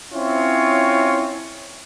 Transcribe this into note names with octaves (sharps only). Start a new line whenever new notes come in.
C4 C#4 E4 F4 C#5